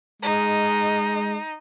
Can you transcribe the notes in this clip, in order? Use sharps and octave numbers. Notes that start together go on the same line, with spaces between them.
G#3 D#4